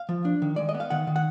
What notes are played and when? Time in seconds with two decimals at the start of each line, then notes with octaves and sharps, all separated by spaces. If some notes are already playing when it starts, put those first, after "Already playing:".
Already playing: F5
0.09 F3
0.25 D4
0.42 D#3
0.56 G#3 D5
0.69 D#5
0.74 B3
0.80 F5
0.90 D#3 F#5
1.07 D#3
1.16 F#5